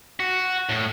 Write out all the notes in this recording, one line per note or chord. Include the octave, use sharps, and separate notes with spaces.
F#4
A2